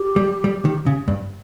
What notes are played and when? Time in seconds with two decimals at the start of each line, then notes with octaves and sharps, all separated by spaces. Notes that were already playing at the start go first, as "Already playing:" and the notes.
Already playing: G4
0.16 G3
0.44 G3
0.65 D#3
0.86 C#3
1.08 G2